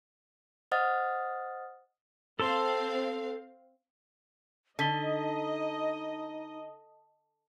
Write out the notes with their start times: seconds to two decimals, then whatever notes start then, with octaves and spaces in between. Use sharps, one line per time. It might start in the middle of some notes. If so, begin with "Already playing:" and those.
0.72 C5 D#5 F#5 D#6 F6 A6
2.40 C4 A4 F5 A5 C6
4.79 D3 D#4 D#5 A5 B6 G7